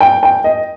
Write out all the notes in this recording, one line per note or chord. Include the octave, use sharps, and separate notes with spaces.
G5
G5
D#5